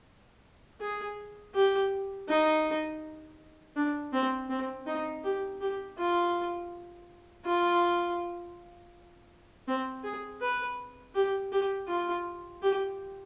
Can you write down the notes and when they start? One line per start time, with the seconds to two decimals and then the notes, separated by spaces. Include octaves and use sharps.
0.81 G#4
1.55 G4
2.28 D#4
3.76 D4
4.13 C4
4.50 C4
4.86 D#4
5.24 G4
5.61 G4
5.98 F4
7.45 F4
9.68 C4
10.04 G#4
10.41 B4
11.15 G4
11.52 G4
11.88 F4
12.62 G4